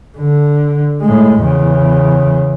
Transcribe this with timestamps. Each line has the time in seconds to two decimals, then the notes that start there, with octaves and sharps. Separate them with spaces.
0.18 D3
1.01 A2 G#3
1.42 E2 C#3